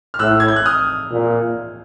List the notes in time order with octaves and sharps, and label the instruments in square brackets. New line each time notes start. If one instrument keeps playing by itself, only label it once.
[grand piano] F6
[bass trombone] A2 [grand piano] E6 F#6
[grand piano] G#6
G6
F#6
D#6 F6
[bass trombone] A#2